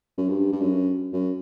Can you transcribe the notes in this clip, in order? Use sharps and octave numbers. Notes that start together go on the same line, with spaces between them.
F#2
G2
G2
F#2
F#2